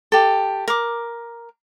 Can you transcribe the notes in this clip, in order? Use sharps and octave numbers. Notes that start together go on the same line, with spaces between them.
G4 A4
A#4 D6